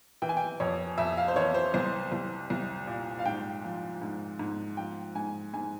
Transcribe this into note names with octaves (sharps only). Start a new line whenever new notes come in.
E3 G5
G#5
G5
F2 C#5
F2 E5
F5
C5
E3 C#5
C5
C2 C5
C2
C2
A#2
F5
G#2 G5
F3
G#2
G#2
F3 G5
G#2 G#5
G#2 G#5